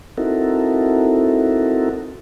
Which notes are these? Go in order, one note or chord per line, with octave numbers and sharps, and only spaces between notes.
C4 D#4 E4 F#4 A4 A#4